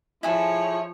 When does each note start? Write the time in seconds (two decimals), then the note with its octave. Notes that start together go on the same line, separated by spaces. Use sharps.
0.23 F3 E4 G#4 A4 C#5